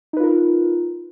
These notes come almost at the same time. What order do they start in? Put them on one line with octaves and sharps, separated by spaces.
D#4 B4 F4 A#4